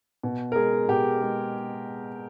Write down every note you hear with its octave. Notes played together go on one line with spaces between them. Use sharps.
B2
A#4
G#3 G#4
B2 G4
G#3